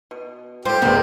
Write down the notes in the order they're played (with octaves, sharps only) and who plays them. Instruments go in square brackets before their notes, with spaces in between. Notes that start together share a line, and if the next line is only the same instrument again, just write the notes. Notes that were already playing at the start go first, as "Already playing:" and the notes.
[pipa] B2
[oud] G3 F4 [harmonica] G4 [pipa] A4 C5
[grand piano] E1 B3 [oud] A#3 [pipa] C5 A#5